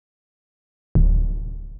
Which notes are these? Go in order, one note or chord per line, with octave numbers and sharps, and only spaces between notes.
D1